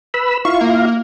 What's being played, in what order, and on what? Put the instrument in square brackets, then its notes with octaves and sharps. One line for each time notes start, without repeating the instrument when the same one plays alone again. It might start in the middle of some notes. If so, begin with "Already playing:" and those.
[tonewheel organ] B4 B5 E6
[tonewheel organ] E4 F4 F5 [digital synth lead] C#6
[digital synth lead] A#3